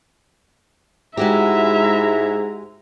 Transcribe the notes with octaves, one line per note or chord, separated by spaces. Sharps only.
G#2 G#3 E4 F#4 G4 E5 A#5